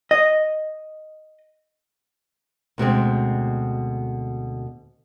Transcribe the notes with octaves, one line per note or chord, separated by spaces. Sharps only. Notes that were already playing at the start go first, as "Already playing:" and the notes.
D#5
D2 B2 G#3 C4